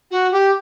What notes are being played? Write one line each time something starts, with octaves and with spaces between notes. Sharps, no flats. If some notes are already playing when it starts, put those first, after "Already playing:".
F#4
G4